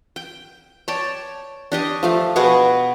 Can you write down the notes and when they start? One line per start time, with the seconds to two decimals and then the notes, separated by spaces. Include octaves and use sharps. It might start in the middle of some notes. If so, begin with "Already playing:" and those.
0.16 G5
0.88 C#5 D5 G5 A5
1.72 D4 G4 D#5 C#6
2.03 F3 A3 F5
2.36 B2 B3 G#4 C#6